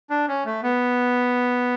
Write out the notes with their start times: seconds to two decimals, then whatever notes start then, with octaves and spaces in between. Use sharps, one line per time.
0.10 D4
0.28 C#4
0.45 A3
0.63 B3